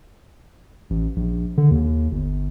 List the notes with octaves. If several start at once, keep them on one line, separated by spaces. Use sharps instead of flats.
A1
A#1
D3
D#2
G1